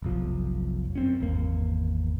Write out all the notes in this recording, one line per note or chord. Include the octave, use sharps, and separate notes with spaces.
F1 B1 F3
F#2 C4 C#4
G#1 E2 A#3